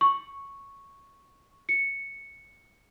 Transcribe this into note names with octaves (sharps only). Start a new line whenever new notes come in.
C#6
C#7